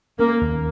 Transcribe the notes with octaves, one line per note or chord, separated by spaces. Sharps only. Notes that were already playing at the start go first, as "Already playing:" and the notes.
A#3 C#4
D#2